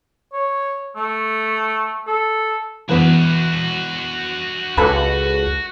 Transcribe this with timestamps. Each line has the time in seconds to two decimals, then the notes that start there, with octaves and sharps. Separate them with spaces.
0.34 C#5
0.96 A3
2.08 A4
2.89 E2 B3 F#4 E5
4.77 C#2 A4 B4 B5 F#6